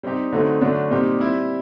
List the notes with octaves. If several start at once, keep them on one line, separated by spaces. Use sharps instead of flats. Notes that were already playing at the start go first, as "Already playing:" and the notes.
G3 C4 D#4 G4
D3 F#3 A3 C4 D#4
D3 F#3 A3 D4
A#2 G3 C4 D#4 G4
G3 C4 E4